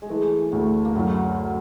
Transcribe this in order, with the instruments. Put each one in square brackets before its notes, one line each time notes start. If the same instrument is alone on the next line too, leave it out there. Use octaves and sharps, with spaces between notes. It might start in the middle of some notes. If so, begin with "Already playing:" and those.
[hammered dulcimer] G#3
[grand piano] E3 [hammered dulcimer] A3
[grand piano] D2 [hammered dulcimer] A3
[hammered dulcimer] A#3
[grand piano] F#2 [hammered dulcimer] A3